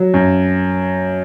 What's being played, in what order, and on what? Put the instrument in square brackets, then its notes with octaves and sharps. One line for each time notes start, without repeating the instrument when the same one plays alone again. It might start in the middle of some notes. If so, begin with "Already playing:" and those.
Already playing: [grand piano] F#3
F#2